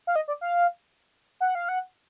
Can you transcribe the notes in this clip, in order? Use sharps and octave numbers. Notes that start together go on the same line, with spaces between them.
F5
D#5
D5
F5
F#5
F5
F#5